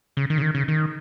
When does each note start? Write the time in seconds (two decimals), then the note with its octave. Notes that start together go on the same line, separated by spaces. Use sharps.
0.17 C#3
0.30 D#3
0.38 C#3
0.42 D#3
0.55 C#3
0.68 D#3